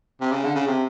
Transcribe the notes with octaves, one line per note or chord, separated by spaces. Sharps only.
C3
C#3
D3
C#3
C3